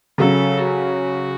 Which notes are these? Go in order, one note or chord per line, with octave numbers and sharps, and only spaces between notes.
C#3 F#3 C#4 A4
F#4